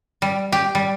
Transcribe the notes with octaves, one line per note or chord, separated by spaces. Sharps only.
G3
G4
G3